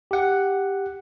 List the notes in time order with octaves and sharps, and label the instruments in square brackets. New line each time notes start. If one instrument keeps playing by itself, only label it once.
[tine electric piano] G4 F#5